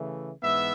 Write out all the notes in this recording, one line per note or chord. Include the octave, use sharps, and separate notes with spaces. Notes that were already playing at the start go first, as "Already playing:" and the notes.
Already playing: C#3 E3 A3
G#2 E3 B3 E5